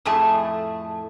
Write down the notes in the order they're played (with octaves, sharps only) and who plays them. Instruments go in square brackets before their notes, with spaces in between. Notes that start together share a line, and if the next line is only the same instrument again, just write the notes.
[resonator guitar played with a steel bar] F2 A2 A3 G#4 A5